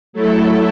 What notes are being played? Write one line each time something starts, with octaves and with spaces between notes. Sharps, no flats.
F#3 A3 E4 A4